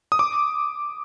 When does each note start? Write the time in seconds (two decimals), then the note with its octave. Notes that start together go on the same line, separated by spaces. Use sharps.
0.12 D#6
0.19 D6